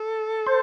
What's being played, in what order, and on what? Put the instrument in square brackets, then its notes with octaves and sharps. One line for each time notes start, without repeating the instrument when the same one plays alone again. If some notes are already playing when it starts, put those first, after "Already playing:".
Already playing: [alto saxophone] A4
[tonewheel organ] C5